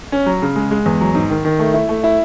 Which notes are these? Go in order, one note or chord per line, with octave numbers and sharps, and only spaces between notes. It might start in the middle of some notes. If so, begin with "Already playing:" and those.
C#4
F#3
C#3
G#3
G#3
E2
F#3
G#2
D#3
D#3
A3
E4
A3
E4